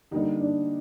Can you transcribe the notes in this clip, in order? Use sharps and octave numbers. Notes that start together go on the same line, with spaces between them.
D3 G3 A#3 D#4
D4